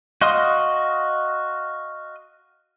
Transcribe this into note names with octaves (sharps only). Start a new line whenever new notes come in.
F#4 D#5 F5 C6 D#6